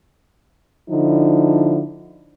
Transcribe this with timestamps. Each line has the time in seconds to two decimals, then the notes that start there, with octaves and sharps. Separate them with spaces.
0.90 D3 F3 D#4 E4